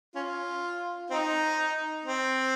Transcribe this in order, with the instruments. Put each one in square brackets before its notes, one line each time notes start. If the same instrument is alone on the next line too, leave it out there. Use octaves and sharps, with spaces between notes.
[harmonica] C#4 F4
C4 D#4
C4